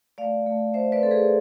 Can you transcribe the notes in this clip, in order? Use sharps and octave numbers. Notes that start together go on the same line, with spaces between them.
A3 D5 F5
A3
A3 C5 E5
B4 D5
C4 A4
G#4 B4